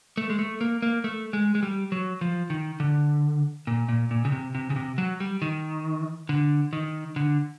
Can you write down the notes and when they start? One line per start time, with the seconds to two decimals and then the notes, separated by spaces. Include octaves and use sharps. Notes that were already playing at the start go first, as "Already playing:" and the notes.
0.17 A3
0.30 G#3
0.39 A3
0.61 A#3
0.82 A#3
1.04 A3
1.33 G#3
1.55 G#3
1.63 G3
1.92 F#3
2.21 F3
2.50 D#3
2.80 D3
3.67 A#2
3.89 A#2
4.11 A#2
4.25 C#3
4.32 C3
4.55 C3
4.70 C#3
4.76 C3
4.98 F#3
5.20 G3
5.42 D#3
6.29 D3
6.73 D#3
7.16 D3